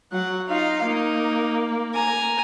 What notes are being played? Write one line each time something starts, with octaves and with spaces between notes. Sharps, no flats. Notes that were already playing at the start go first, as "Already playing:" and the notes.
F#3 F#5
D#4 F4 F5
A#3 D#4
G#5 A#5